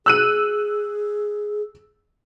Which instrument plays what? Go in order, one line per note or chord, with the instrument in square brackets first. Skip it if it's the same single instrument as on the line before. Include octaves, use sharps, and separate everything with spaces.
[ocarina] G#4 [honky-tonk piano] E6 F#6 D#7